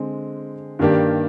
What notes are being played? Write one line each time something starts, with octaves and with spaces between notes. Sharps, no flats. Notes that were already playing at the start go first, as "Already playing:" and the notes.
Already playing: D3 G#3 C4
G2 D#3 A#3 D4 G4